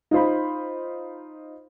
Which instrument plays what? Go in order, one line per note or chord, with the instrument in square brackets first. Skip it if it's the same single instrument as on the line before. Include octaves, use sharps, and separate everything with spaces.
[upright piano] D#4 F4 C5 B5